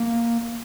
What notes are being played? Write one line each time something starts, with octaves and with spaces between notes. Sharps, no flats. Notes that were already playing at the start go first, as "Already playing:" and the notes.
Already playing: A#3